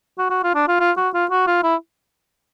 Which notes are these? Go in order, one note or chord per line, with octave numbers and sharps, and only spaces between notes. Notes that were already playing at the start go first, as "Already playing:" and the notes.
F#4
F#4
F4
D4
F4
F4
F#4
F4
F#4
F4
E4